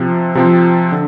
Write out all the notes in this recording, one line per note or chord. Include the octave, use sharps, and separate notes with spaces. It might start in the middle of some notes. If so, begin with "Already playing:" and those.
Already playing: C3 F3 C4
C3 F3 C4
D3